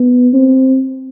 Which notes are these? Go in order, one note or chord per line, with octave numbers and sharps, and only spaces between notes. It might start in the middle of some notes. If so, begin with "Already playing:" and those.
Already playing: B3
C4